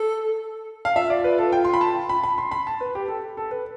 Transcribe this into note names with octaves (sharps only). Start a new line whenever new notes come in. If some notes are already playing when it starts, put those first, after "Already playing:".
Already playing: A4
F5
F4 E5
D5
B4
A4
G5
C6
B5
A5
B5
B5
C6
B5
A5
B4
G4
A4
A4
B4